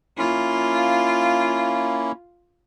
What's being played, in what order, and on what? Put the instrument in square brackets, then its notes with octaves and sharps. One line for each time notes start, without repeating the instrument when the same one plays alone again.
[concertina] A#3 C#4 E4 [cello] F4